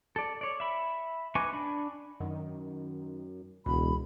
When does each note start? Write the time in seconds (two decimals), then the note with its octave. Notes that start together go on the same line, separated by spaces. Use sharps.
0.16 A4 D5
0.41 C#5 D5
0.60 E5 B5
1.35 D#4 B4 G#5 C#6 D6
1.53 D4 B5
2.20 F#2 D#3
3.66 E1 C#2 B2 B5